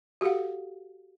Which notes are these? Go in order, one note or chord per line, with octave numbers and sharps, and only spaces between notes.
F#4 G4 A4 F5 F#5